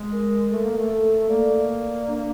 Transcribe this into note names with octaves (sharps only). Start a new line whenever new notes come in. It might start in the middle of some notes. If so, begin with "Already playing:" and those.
Already playing: G#3
A#4
A3 A4
A#3
A3
A4
A#3 D5
D5
D4